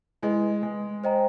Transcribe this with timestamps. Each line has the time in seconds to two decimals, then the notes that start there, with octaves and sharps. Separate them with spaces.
0.23 G#3 E4 G#4 B4 D#5
0.63 G#3
1.04 C5 D#5 G5 A#5